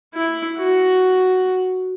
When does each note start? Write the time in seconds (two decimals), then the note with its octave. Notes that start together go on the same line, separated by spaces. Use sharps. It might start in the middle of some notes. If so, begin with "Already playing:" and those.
0.14 E4
0.58 F#4